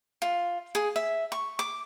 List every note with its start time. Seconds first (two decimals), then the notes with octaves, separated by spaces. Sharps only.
0.22 F4
0.75 G#4
0.96 E5
1.32 C#6
1.59 D6